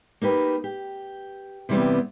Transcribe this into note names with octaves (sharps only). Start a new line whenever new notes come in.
A#3 D#4 G4 B4
G4
C3 E3 G3 B3 C4